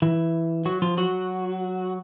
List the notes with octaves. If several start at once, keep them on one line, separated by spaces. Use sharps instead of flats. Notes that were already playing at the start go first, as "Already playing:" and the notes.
E3 E4
F#3 F#4
F3 F4
F#3 F#4